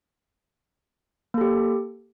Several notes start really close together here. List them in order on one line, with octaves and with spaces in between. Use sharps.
A#3 A4 G4